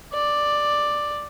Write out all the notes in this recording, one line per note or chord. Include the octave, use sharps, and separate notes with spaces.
D5